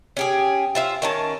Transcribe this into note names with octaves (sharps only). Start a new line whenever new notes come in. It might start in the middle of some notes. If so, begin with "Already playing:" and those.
C#4 G4 G#4
F4 C5 E5
D#3 C#4 A5